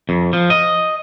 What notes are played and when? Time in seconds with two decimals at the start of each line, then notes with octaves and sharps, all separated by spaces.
0.09 F2
0.33 F3
0.50 D#5